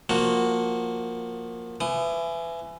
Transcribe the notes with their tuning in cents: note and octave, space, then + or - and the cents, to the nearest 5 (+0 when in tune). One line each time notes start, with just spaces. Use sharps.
F3 +15 A#3 +0 F#4 +0
E3 +25 D#6 -15